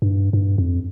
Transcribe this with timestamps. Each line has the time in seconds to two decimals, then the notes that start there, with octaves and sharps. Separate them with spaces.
0.02 G2
0.33 G2
0.58 F2